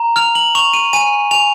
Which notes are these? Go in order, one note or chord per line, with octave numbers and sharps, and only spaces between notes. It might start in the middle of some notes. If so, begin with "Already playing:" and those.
Already playing: A#5
F6 F7
F#7
C#6 F7
D#7
G#5 D#7
G#5 F7